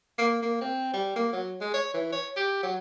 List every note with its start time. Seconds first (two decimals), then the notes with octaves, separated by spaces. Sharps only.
0.18 A#3
0.42 A#3
0.61 C4
0.94 G3
1.16 A#3
1.33 F#3
1.61 G#3
1.74 C#5
1.94 E3
2.12 C#5
2.36 G4
2.63 F#3